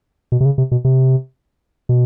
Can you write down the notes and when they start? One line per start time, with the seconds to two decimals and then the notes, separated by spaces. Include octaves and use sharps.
0.32 B2
0.41 C3
0.45 C#3
0.58 C3
0.72 B2
0.85 C3
1.89 B2